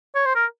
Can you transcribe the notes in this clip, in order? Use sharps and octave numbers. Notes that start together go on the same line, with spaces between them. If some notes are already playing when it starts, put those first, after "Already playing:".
C#5
C5
A#4